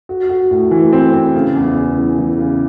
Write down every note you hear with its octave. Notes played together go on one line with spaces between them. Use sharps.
F#4
F#4
A2
E3
C4
C4
C#3
E2
C#3
E3
E3
C#3